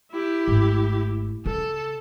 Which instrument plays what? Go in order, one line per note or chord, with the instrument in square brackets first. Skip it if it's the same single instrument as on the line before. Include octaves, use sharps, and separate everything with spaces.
[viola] E4 G4
[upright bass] G#1 A3
[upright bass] C#3 [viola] A4